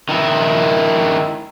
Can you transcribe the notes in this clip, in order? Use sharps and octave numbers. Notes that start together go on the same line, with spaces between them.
D#3 E4